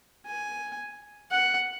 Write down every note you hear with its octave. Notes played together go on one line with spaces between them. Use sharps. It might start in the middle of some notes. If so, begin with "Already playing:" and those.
G#5
F#5